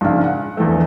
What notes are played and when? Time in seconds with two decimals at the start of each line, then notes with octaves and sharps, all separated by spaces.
0.01 A#1 G#2 C#3 F5
0.24 F#5
0.57 A#1 E2 E3 A3